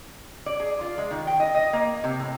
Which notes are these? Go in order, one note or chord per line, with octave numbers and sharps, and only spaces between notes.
D5
G#4
F4
G#3
D#3
G5
D#5
D#5
A#3
C3
A2